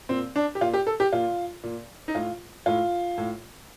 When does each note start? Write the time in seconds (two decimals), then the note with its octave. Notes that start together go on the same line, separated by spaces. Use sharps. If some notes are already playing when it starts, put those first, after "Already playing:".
0.09 A#2 C4
0.36 D4
0.55 G4
0.61 A#2 F4
0.74 G4
0.87 A4
1.00 G4
1.12 A#2 F4
1.63 A#2
2.08 D#4
2.15 A2 F4
2.66 A2 F4
3.18 A2